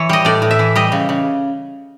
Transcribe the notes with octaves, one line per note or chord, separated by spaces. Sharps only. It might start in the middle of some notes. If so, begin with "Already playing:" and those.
Already playing: E3 C#5
G3 D#5
A2 D5
A2
E5
E3
G3 D#5
C#3
C#3